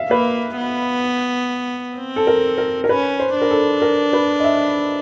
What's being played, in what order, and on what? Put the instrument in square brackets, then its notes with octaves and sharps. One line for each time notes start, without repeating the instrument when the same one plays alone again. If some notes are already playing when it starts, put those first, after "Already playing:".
Already playing: [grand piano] E5 F5
[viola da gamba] A#3 [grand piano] B4
[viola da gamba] B3
C4
[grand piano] A4
A#4
A#4
A#4
[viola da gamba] C#4 [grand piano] B4
[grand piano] C5
[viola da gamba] D4
[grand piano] A#4
A4
A#4
B4
D#5
E5